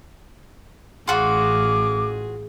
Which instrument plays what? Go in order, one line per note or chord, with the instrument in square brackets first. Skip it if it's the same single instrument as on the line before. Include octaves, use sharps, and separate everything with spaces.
[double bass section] A1 [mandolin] F4 F#4 [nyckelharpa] G#4 [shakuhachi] D6